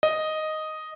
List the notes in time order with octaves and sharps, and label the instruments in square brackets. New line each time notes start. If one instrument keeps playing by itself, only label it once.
[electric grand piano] D#5